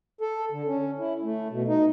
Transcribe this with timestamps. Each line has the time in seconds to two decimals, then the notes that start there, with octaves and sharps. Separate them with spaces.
0.21 A4
0.52 D3
0.66 C#4
0.99 E4
1.23 A3
1.51 B2
1.68 D#4